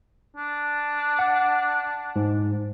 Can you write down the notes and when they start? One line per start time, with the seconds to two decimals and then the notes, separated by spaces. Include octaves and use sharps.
0.36 D4
1.19 F#5
2.16 G#2